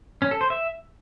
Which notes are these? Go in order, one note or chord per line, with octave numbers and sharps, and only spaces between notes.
C#4
A4
C5
E5